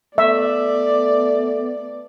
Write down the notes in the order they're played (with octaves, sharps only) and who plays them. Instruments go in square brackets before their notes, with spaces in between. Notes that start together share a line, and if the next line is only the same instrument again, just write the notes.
[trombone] A3 [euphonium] B3 [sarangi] D5 [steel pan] E5